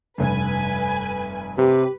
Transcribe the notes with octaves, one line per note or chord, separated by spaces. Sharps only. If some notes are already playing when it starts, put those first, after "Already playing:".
F1 G2 B4 G#5
C3 G4 B4